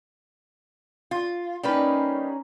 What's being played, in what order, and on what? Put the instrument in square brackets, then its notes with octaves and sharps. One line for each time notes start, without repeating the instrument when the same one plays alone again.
[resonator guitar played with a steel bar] F4
[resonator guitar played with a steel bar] G3 A#3 B4 [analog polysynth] C#4 D#4